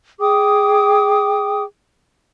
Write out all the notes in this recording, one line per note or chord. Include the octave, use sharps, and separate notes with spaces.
G#4 G5 D6 D#6